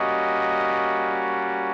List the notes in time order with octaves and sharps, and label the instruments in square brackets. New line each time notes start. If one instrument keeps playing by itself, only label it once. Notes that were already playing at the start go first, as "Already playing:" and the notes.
Already playing: [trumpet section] G3 A#3 C#4 F#4 D#5